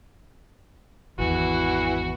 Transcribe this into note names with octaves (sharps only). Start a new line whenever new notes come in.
G#1 E2 E3 F#4